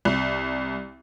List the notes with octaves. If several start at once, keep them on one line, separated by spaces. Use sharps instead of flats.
C2